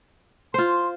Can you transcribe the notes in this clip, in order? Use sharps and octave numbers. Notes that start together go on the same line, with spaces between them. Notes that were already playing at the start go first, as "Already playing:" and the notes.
F4 C5 C6